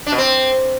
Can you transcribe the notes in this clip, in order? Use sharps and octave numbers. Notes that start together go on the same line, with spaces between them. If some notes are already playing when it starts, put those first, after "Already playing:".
D4
B2
C4